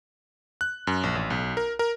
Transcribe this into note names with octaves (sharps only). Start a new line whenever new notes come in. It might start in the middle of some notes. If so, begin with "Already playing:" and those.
F#6
F#2
A#1
A1
B1
A#4
A#4